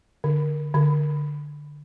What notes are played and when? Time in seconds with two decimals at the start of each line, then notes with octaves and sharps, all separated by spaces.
0.24 D3
0.74 D3